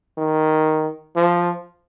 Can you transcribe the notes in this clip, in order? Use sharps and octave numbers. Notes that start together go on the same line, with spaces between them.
D#3
F3